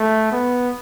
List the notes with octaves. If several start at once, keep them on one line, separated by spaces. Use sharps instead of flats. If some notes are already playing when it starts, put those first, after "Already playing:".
Already playing: A3
B3